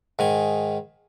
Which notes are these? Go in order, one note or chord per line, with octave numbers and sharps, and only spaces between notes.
G#2 D#3 G#5